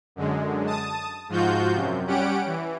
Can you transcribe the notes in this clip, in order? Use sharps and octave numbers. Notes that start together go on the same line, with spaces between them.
F#2 D3 G#3
A5 D#6
G#2 F3 F4 F#4 G6
F#2 C3
G3 C#4 G4 F#5 D7
E3